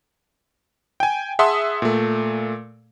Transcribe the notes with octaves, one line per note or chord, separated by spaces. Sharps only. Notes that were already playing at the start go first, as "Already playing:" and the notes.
G5 G#5
G#4 E5 F#5 A5 C6 D#6
A#2 A3